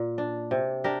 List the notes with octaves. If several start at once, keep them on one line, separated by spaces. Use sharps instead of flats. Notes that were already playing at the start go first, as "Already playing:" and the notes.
Already playing: A#2
D4
C3
D4 G4 A#4